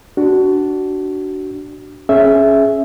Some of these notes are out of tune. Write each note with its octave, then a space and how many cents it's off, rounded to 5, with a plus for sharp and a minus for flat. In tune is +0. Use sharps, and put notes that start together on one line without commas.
D4 +0 F#4 +20
C#4 +0 G#4 +20 E5 +0